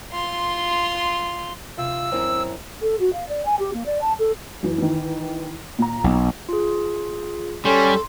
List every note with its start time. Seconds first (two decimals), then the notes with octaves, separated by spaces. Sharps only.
0.12 F4 C6
1.78 C3 F4 E6
2.12 F#2 C4 E4 A#5
2.81 A4
2.99 F#4
3.12 F5
3.28 D5
3.45 G#5
3.59 G4
3.73 A#3
3.85 D5
4.01 A5
4.19 A4
4.63 F#2 E3
4.78 D#3 E3
5.78 A#2 A#5
6.04 B1
6.49 F4 G#4
7.65 G3 C#4 A4 C6